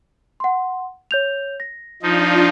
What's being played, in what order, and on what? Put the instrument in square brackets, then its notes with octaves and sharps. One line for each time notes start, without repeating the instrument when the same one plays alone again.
[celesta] F#5 C6
C#5 G6 F7
A#6
[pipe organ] F3 D#4 [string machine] D4 F4